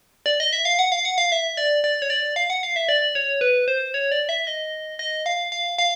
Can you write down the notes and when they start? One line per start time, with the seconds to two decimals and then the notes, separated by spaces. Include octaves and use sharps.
0.26 D5
0.40 D#5
0.53 E5
0.65 F5
0.79 F#5
0.92 F5
1.05 F#5
1.18 F5
1.32 E5
1.57 D5
1.84 D5
2.02 C#5
2.10 D5
2.36 F5
2.50 F#5
2.63 F5
2.76 E5
2.89 D5
3.15 C#5
3.41 B4
3.68 C5
3.94 C#5
4.12 D5
4.29 E5
4.47 D#5
4.99 D#5
5.26 F5
5.52 F5
5.78 F5